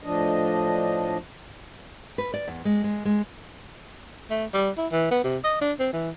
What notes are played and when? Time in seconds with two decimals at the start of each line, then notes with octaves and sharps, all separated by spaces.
0.03 A2 F3 D4 D#5
2.18 B4
2.34 D5
2.48 E2
2.65 G#3
2.84 G#3
3.05 G#3
4.30 A3
4.54 G3
4.78 E4
4.92 E3
5.11 B3
5.24 C3
5.44 D#5
5.61 D4
5.79 C4
5.93 E3